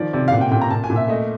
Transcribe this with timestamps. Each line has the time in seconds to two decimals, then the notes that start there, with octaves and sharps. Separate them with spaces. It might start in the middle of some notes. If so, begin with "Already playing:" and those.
Already playing: D#3 F3 D5
0.13 C3 D5
0.28 F5
0.32 A#2 F#5
0.41 G5
0.51 A#2 G5
0.61 A#5
0.71 A#2 A5
0.84 G#5
0.90 A#2
0.96 E5
1.08 A3 D#5